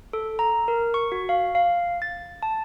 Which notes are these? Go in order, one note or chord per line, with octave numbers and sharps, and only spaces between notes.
A4
A#5
A#4
C#6
F#4
F5
F5
A6
A5